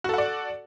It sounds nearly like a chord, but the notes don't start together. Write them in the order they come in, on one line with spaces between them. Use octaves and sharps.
F#4 A4 F#5 D5